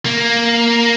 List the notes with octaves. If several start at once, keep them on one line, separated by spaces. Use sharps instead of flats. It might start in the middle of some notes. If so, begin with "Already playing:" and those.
A#3